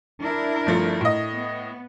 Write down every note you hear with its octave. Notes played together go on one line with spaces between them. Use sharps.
D4 E4 A#4
G1 F3 A3
A2 D#5
B3